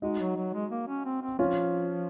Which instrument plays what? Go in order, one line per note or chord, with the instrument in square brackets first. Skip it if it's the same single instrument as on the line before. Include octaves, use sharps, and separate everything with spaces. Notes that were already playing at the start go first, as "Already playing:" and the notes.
[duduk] G#3 [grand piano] D#4 F#4
[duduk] F#3
F#3
G#3
A#3
C#4
C4
C4
[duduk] F3 [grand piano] C#4 F4